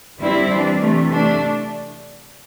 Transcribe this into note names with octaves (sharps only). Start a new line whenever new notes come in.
D3 G3 C4 E4
E3 G3 D4
C3 E3 A3
A3 D4